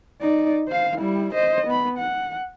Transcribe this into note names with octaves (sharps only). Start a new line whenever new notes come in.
D#4 D5
C5 F5
G3 E4
C5 D#5
B3 B5
F#5